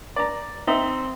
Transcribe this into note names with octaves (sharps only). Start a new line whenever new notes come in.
D5 A#5
C4 D#4 E5